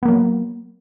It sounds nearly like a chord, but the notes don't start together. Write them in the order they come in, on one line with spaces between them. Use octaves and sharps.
B3 A#3 F#3